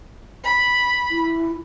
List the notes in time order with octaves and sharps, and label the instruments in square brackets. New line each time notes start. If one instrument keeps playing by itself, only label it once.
[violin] B5
[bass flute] E4